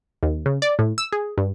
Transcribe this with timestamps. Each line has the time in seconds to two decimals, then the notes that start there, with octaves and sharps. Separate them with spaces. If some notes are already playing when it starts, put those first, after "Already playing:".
0.23 D#2
0.46 C#3
0.62 D5
0.79 A2
0.98 E6
1.13 G#4
1.38 G2